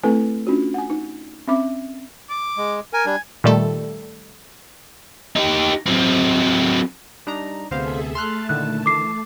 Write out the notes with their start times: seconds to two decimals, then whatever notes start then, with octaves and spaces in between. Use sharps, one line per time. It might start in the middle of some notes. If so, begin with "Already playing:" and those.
0.03 A3 C4 E4 A4 B4 G#5
0.47 C#4 D4 F4 F#4
0.74 F#5 G#5
0.90 D#4
1.48 C4 C#4 E5 B5 D6
2.30 D6
2.57 G#3
2.93 A#4 G#5
3.06 G3 D4 G#5
3.44 A#2 D#3 G3 A3 A4
5.36 D#4 G4
5.86 F#3 C4
7.27 G3 D4 D#4 A#5
7.71 D2 C3 B3 G#4 A4 C5 E5 F5
8.15 A3 A4 A5 C6 F6 F#6
8.49 A#2 D3 D#3 E4 F#6
8.86 E3 D6 C7